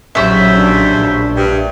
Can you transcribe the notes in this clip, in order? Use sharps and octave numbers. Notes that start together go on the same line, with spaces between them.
A#1 D#2 C#3 F#3 C#4 C5 E5
D4
A#1
G2